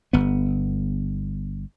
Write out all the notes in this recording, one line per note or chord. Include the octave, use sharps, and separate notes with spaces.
G1 B3